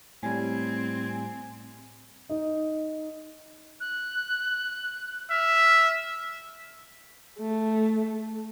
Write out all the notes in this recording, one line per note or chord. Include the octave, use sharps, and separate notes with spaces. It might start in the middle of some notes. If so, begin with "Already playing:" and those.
A2 G3 C4 G#5
D#4
F#6
E5 F6
A3